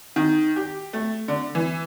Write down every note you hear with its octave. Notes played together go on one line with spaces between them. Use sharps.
D#3
G4
A3
D3
E3